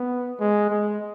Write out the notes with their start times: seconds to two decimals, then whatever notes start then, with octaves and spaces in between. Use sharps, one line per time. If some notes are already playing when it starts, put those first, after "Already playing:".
Already playing: B3
0.40 G#3
0.71 G#3